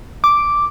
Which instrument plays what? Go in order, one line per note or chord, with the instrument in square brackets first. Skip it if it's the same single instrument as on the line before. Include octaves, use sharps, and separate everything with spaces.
[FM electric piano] D6